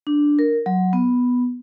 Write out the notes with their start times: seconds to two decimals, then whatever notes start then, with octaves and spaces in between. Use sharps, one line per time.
0.07 D4
0.39 A#4
0.66 F#3
0.93 B3